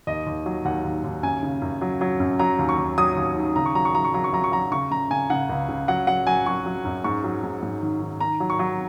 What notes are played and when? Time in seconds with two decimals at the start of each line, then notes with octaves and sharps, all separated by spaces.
0.07 D#2 D#5
0.27 D#2
0.46 F#3
0.65 D#2 F#5
0.84 D#2
1.04 D#2
1.23 F#2 G#5
1.43 C#3
1.62 F#2
1.81 F#3
2.01 F#3
2.20 F#2
2.39 F#3 A#5
2.59 D#2
2.69 C#6
2.78 D#2
2.98 F#3 D#6
3.17 D#2
3.36 D#3
3.56 C#3 A#5
3.66 C#6
3.75 F#3 A#5
3.85 C#6
3.94 F#3 A#5
4.05 C#6
4.14 F#3 A#5
4.24 C#6
4.33 F#3 A#5
4.44 C#6
4.52 F#3 A#5
4.72 C#3 C#6
4.91 C#3 A#5
5.11 C#3 G#5
5.30 C#3 F#5
5.50 C#2
5.69 C#3
5.88 F#3 F#5
6.07 F#3 F#5
6.27 F#3 G#5
6.46 F#3 C#6
6.66 F#3
6.85 F#2
7.04 G#2 C#6
7.24 F#3
7.43 G#2
7.62 G#2
7.82 D#3
8.01 D#3
8.20 D#3 A#5
8.40 F#3
8.50 C#6
8.59 F#3